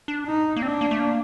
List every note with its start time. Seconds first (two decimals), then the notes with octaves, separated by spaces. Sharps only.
0.08 D4
0.27 D#4
0.56 A#3
0.62 C4 D4
0.81 A#3
0.91 A3
0.99 A#3